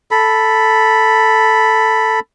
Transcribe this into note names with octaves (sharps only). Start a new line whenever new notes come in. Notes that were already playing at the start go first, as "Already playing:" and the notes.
A4 B5